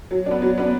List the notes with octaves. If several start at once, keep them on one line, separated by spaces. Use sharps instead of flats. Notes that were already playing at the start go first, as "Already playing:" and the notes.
F#3
B3 D4
F#3
B3 D4